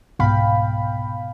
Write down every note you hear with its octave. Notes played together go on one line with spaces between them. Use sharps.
C2 G#2 B2 F5 G5 B5